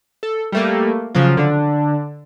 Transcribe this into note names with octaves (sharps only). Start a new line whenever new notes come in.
A4
G3 A3 A#3
C#3 F3 F#3 F4
D3 D4